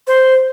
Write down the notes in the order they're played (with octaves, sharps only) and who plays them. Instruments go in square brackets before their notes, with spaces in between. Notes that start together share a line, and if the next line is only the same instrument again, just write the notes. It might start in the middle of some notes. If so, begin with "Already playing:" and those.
[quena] C5